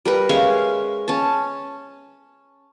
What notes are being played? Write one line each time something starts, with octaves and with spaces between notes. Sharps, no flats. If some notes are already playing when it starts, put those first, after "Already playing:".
G3 A#4 B4
G#3 C#4 E5 F5
C#4 A5